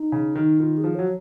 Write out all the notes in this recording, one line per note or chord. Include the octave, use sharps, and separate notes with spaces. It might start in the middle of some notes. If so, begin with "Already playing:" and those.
Already playing: D#4
C#3
D#3
D#3 F4
G#4
F3
F#3 C#5